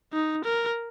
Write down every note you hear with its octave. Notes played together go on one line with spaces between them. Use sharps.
D#4
A#4